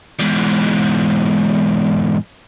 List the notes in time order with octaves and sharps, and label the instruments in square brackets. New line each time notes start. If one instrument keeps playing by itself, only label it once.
[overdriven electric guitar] E2 G#2